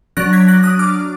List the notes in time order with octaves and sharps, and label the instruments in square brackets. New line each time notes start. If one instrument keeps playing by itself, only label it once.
[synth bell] F#3 D4 F#6 A#6
G#6 B6
F#6 A#6
D#6 F#6
D6 F6